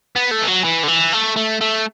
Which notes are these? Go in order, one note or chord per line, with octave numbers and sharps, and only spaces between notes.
B3
A3
E3
F#3
E3
D3
E3
A3
A3
A3